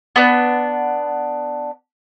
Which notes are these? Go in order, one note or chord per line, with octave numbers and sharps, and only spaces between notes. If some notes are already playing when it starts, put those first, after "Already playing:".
B3 D4